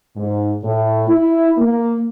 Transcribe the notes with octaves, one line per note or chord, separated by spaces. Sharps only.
G#2
A2
E4
A#3